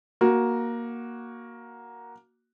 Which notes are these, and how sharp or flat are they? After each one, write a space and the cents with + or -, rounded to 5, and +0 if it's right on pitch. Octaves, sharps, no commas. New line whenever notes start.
A#3 +10 F#4 +0